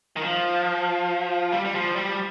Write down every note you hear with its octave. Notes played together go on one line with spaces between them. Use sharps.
D#3
F3
G3
G3
F3
G3